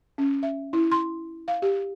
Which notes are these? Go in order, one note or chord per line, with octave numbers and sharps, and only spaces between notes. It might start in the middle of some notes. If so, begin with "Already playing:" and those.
C#4
E5
E4
C6
F5
G4